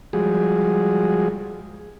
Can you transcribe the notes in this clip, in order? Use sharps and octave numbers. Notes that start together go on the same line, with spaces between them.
F3 G3 G#3 F#4 G#4